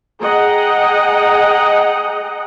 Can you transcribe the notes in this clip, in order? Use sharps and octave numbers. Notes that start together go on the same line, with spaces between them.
G#4 D#5 F#5 G5 A#5